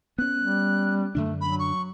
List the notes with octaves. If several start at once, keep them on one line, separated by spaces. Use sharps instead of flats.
B3 C#4 F#6
G3
F#2 D3 A3 D4
F#3 B5
C#6